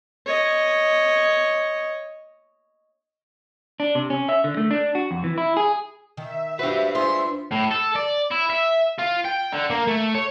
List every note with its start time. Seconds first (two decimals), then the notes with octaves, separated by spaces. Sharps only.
0.26 C#5 D#5
3.80 D4
3.95 C3
4.10 C#4
4.29 E5
4.44 D3
4.57 A3
4.71 D4
4.95 F#4
5.11 F2
5.24 E3
5.38 E4
5.57 G#4
6.17 D#3 E5
6.59 D4 F#4 G4 B4 C5
6.95 F4 G#4 C5 C6
7.52 A2
7.71 A4
7.96 D5
8.31 E4
8.50 E5
8.98 F4
9.25 G5
9.52 D3
9.70 A#3
9.87 A3
10.14 C#5